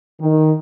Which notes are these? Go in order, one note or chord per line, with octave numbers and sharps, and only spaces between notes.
D#3